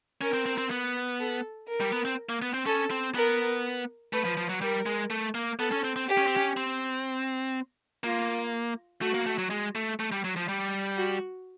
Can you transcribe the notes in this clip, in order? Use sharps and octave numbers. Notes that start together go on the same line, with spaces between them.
C#4 A#4
C4
C4
C4
B3
A4
A#4
G3
B3
C4
A#3
B3
C4
C#4 A4
C4
B3 A#4
A3 B4
F3
F3
F#3
G3 A#4
G#3
A3
A#3
B3 A4
C#4
C4
C4
G4
C#4
C4
C#4
C4
A#3 F4
A3 F#4
A#3
A3
F#3
G#3
A3
A3
G3
F#3
F3
G3
F#4